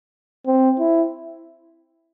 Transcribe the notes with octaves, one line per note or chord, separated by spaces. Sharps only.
C4
E4